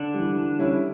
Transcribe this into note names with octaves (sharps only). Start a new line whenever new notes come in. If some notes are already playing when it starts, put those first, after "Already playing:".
Already playing: D3 D4
E3 G3
E3
G3 C#4 E4